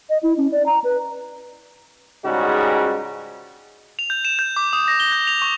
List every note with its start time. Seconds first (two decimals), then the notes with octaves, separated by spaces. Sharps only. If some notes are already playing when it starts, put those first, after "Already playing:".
0.10 D#5
0.23 E4
0.37 C#4
0.52 D5
0.66 A#5
0.84 B4
2.25 C#2 G#2 C#3 G3 D#4 F#4
3.99 F7
4.10 G6
4.25 E7
4.39 G6
4.56 D6
4.73 D#6
4.88 A#6
5.00 G7
5.12 G6
5.27 F7
5.42 C#6